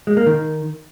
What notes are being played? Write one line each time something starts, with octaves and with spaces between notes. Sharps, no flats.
G#3
A#3
D#3